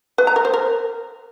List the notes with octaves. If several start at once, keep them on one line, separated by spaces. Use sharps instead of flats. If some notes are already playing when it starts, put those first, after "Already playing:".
B4
A#5
A#4
C5
A#4